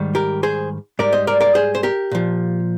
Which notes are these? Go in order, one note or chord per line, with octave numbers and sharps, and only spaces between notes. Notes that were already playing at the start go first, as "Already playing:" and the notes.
Already playing: G#2 D#3 G3
G4 A#4
G#4 C5
G#2 G3 A#4 D5
C5 D#5
A#4 D5
A#4 D5
G#4 C5
C5
G4 A#4
A#2 F3